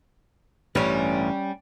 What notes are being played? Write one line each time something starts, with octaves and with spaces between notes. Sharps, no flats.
A1 G2 G3 C#4